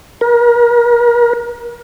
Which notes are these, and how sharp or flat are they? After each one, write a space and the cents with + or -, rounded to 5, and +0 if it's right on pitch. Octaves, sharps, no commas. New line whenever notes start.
A#4 +35